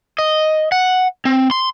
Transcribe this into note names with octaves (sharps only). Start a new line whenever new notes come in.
D#5
F#5
C4
C6